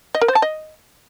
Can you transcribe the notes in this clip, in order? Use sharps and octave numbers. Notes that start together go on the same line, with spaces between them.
D#5
A#4
C5
A5
D#5